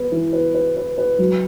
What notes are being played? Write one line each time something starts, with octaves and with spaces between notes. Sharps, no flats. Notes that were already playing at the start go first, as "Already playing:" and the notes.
Already playing: B3 B4
E3
B4
B4
B4
B4
F#3